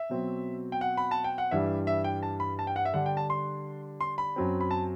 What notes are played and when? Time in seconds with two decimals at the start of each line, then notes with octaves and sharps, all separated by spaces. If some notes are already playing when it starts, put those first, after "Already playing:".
Already playing: E5
0.10 B2 F#3 C4
0.72 G5
0.81 F#5
0.97 B5
1.11 A5
1.24 G5
1.38 F#5
1.51 G2 E3 G3 D4 E5
1.87 E5
2.04 G5
2.23 A5
2.40 B5
2.59 A5
2.67 G5
2.76 F#5
2.85 E5
2.94 D3 G3 D4 F#5
3.06 G5
3.17 A5
3.30 C6
4.01 C6
4.18 B5
4.36 F#2 F#3 C4
4.61 B5
4.71 A5